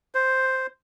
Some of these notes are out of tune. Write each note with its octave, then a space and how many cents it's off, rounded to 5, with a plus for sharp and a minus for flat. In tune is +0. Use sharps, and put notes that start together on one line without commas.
C5 +0